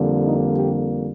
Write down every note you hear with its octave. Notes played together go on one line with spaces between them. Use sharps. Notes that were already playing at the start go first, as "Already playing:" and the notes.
Already playing: F2 D3 G3 A#3
D#4
G4